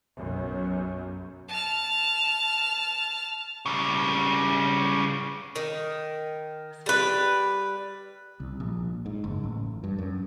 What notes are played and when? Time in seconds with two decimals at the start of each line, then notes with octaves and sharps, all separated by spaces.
0.19 B1 F#2
1.49 A5 F6
3.66 C#3 G3
5.56 D#3
6.86 G3 B4
8.40 C2
8.60 A#1
9.06 G#2
9.24 F#1
9.43 A1
9.84 G2
9.99 F#2